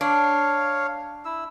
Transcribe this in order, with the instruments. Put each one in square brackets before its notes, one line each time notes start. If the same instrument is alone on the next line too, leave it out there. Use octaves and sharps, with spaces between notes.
[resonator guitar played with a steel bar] D4 [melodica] C#5 F5
[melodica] E4 E6